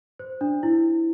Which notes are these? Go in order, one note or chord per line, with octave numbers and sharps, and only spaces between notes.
C5
D4
E4